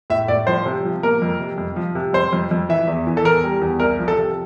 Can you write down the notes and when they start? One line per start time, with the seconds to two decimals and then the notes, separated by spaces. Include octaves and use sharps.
0.10 A2 E5
0.28 A2 D5
0.47 F3 C5
0.66 C3
0.85 F3
1.03 A#3 A#4
1.22 F2
1.40 C3
1.58 F2
1.76 F3
1.95 C3
2.13 F2 C5
2.33 F2
2.51 F2
2.69 E3 E5
2.88 E2
3.07 E3
3.17 A4
3.24 E2 A#4
3.44 G3
3.62 E2
3.80 C2 A#4
3.99 F3
4.08 A4
4.18 C3